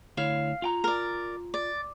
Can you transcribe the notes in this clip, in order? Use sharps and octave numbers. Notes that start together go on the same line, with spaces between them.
D2 E4 C#5 F5
F4 G5 A#5
A#4 D5
D5